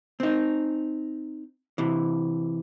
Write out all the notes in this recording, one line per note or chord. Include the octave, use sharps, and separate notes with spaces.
C4 D#4
C3 E3